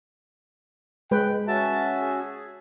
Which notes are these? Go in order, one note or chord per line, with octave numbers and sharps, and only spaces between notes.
G#3 B4 G5
C#4 F#4 E5 A5
G#4